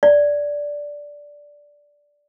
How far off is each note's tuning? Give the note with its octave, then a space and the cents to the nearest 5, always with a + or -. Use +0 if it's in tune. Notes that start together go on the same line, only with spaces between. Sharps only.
D5 -10